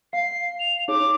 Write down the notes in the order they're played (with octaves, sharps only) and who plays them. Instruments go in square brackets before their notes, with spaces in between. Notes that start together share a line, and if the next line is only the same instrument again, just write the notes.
[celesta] F5 [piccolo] C7
[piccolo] F7
[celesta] D#4 G#4 C#5 [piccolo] D6